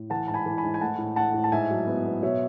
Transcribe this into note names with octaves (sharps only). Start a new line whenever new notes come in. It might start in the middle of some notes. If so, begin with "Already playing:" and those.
Already playing: A2
E3 F#5 A5
G#2 A5
G#5 B5
E3
G#5 B5
G#2
G#5
A3 F#5 A5
A2
A3 F#5 A5
A2
A5
G#2 E5 G#5
F#3
B3
B3
B2 C#5 E5